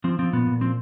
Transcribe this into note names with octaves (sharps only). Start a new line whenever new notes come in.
F3 C4
F3 C4
A#2 B3
A#2
F3 C4